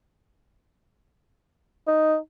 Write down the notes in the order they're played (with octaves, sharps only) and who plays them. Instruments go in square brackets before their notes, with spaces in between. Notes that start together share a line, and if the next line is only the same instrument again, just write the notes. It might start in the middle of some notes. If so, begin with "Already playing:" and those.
[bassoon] D#4